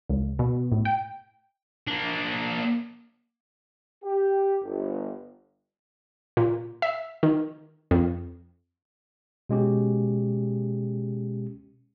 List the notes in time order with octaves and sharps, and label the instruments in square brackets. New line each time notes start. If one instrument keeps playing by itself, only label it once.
[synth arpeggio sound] C#2
B2
A2
G5
[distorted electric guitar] A#3 D4
[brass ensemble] G4
G1
[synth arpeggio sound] A#2
E5
D#3
F2
[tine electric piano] B2 G#3 C#4 G4